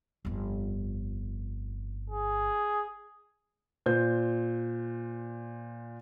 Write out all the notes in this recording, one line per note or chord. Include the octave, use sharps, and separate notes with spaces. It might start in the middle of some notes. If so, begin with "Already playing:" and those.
G1 F2
G#4
A#2 C5 G6